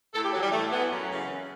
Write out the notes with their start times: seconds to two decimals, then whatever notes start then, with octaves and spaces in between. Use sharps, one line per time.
0.13 A2 A4
0.22 G4
0.32 E3 F#3
0.41 G3
0.51 A2 A3
0.70 E3 B3
0.89 F#2 C#4
1.08 C#3 E3
1.27 F#2